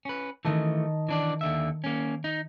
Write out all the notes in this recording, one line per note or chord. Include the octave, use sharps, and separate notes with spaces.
C#4 B4
D#3 E3 A3 D#5 A5
E3 D4 D5
D#2 D3 E5
A#3 C#4
D#4